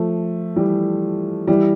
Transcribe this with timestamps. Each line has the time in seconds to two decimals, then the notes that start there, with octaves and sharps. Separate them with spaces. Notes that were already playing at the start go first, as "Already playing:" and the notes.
Already playing: F3 A3
0.56 E3 G3
1.48 E3 G3